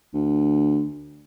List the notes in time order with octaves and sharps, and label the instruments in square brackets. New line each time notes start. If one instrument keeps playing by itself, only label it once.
[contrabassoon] D2